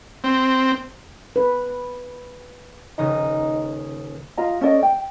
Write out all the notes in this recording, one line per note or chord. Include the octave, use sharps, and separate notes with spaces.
C4
B4
D#1 C#3 D#4 D#6
F4 D#5 A#5
C#4 A4 D5 D#5
G5